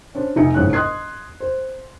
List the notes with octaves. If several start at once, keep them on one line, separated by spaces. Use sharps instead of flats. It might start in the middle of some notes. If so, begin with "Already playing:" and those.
C#4 D4 C5
F1 D#4 E5 G#5 C#7
G1 C2 G#2 C#4 F#6
D#5 C6 D#6 F#6 G#6 C7
C5